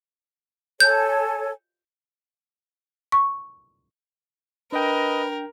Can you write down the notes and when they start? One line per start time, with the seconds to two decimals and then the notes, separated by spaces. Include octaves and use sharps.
0.80 A4 C#5 G#5 G6
3.12 C#6
4.72 D4 A#4 B4 D#5 G5